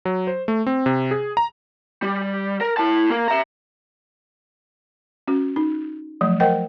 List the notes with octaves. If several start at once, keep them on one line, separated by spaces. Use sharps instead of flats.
F#3
C5
A3
C4
C3
G#4
A#5
G3
A#4
E4 A5
A#3 A#4
E5 A#5
C#4 F#4
D#4
F3 F#3 A3
A#4 C5 D#5 F#5 G5